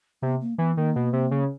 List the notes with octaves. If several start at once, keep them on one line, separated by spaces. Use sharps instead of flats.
C3 B3
A#3
E3 B3
D#3 A#3
B2
C3
C#3